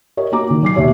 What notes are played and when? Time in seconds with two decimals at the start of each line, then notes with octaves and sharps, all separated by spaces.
0.17 A#4 C#5 D#5
0.32 A#3 F#4 A#5 D6
0.50 D#3
0.63 F#3 D6 C7
0.75 D#2 B2 C#5 E5 D6